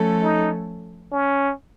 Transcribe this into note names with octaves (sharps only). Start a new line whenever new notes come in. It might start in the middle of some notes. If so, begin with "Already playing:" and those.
Already playing: F3 A3 C#4 A4
D#4
C#4